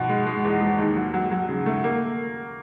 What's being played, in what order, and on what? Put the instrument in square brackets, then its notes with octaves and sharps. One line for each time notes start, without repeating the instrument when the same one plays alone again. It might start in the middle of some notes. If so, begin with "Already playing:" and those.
Already playing: [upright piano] B2 F3 B3
G#3
G#3
E2
G#3
D#2
F#3
F#3
F#3
C#3
A3
A#3